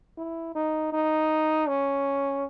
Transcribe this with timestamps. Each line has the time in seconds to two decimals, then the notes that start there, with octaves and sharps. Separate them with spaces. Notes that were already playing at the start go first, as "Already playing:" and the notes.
0.18 E4
0.55 D#4
0.92 D#4
1.67 C#4